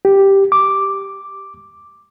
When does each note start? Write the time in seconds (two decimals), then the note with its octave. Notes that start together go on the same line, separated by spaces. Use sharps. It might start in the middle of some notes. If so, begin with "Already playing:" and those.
0.05 G4
0.52 D6